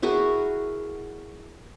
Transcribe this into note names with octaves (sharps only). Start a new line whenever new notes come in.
E4 F#4 G#4 A#4